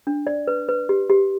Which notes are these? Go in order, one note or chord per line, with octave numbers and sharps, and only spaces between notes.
D4
D5
B4
B4
G4
G4